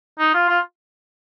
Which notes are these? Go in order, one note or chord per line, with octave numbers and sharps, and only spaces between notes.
D#4
F4
F4